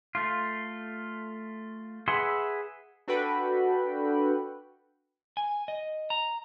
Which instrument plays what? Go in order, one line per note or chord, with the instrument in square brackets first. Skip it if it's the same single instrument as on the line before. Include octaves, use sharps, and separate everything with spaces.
[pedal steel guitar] A3 F4
G#4 B4 E5 F#5 C6
[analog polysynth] D4 F#4 A4 B4 G5 B5
[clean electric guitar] G#5
D#5
A#5